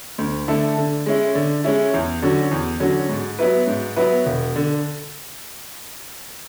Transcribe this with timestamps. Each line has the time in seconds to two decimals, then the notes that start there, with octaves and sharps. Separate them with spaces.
0.18 D2
0.48 D3 A3 E4 A4
0.77 D3
1.06 G#3 C#4 E4
1.35 D3
1.64 G#3 C#4 E4
1.94 E2
2.22 D3 F#3 C#4 F#4
2.51 E2
2.80 D3 F#3 C#4 F#4
3.09 G#2
3.39 F#3 B3 E4 B4
3.67 G#2
3.97 F#3 B3 E4 B4
4.26 E1
4.56 D3